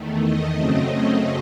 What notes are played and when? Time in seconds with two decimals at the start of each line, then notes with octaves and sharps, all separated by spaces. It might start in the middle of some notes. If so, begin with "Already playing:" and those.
Already playing: E2 D#3 A3
0.20 D#5
0.54 F#2 C#3 F#3 A3 C4